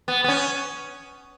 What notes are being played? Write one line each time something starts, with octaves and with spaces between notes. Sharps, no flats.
B3
B3
C#4